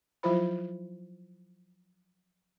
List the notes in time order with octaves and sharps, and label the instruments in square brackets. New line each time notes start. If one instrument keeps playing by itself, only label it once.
[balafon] F3 F#3 E4 F4 C5 B5